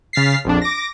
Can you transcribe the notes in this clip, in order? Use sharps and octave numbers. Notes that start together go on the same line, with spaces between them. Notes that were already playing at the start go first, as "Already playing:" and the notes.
C#3 F6 A6 B6 C7
A#1 F2 D4
D6 A#6